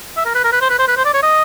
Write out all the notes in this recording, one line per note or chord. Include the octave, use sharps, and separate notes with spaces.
E5
A#4
B4
A#4
B4
C5
B4
C5
B4
C5
D5
C#5
D#5